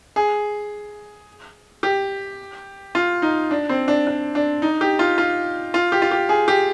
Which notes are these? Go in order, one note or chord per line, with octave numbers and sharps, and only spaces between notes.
G#4
G4
F4
D#4
D4
C4
D4
D4
D4
D#4
G4
F4
F4
F4
G4
F4
G4
G#4
G4